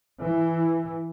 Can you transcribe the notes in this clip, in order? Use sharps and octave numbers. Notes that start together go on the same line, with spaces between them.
E3